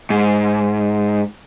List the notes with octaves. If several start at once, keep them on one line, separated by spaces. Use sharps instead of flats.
G#2